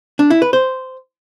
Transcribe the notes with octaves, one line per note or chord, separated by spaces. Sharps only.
D4
E4
B4
C5